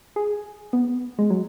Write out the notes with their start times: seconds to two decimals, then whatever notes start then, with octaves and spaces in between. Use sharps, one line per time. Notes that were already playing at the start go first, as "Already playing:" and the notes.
0.16 G#4
0.73 B3
1.19 G#3
1.30 F#3